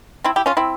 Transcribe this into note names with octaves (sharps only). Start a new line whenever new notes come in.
C4 E4
E4 G4
C#4 F4
C4 E4